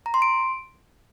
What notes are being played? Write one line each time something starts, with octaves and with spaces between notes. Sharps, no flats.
A#5
C6
D7